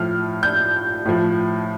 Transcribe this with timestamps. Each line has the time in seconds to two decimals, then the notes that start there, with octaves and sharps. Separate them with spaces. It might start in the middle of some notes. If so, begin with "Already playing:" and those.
Already playing: A2 F3 F6
0.43 G6
1.05 A2 F3